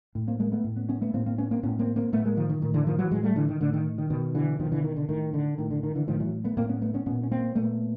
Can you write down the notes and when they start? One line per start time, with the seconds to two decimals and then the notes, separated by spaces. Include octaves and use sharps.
0.15 A2
0.28 A#3 C4
0.40 G#3 A#3
0.52 A3 B3
0.64 A2
0.76 B3 C#4
0.89 B3 C#4
1.01 A3 B3
1.14 A2 A#3 C4
1.26 A#3 C4
1.38 B3 C#4
1.51 A#3 C4
1.63 A2 B3 C#4
1.79 A#3 C4
1.96 A#3 C4
2.12 A2 A3 B3
2.25 G#3 A#3
2.37 D#3 F3
2.49 D#3
2.62 A2 D#3
2.74 D3 E3
2.87 D#3 F3
2.99 E3 F#3
3.11 A2 F#3 G#3
3.23 G3 A3
3.36 D3 E3
3.48 D#3
3.61 A2 D3
3.73 D#3
3.98 D#3
4.10 B2 D#3
4.35 D3 E3
4.60 B2 D#3 F3
4.72 D3 E3
4.84 D#3
4.96 D3
5.09 A2 D#3
5.34 D3
5.58 A2 D#3
5.71 D3
5.83 D#3
5.95 D3 E3
6.07 A2 D#3 F3
6.20 E3 F#3
6.44 A3 B3
6.57 A2 A#3 C4
6.69 B3 C#4
6.82 A3 B3
6.94 B3 C#4
7.06 A#2 B3 C#4
7.23 C#4
7.31 A#3 C4
7.55 A#2 A3 B3